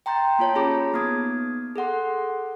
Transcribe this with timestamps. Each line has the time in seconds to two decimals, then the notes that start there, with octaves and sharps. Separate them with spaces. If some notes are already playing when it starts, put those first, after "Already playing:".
0.06 G5 A#5 C6 G6 A6
0.39 A#3 F4 C#5 A5
0.55 C#4 G4 G#4 A#5 B5 D6
0.93 A#3 B3 D#4 D#6 G#6
1.76 G#4 A4 F#5 C6